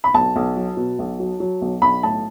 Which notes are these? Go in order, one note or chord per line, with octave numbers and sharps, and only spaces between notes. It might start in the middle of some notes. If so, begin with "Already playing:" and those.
B5
B1 A5
B1
F#3
B2
B1
F#3
F#3
B1
B1 B5
A2 A5